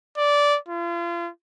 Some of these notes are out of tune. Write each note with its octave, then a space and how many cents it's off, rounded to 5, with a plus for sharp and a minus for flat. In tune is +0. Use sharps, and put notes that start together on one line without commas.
D5 -15
F4 -35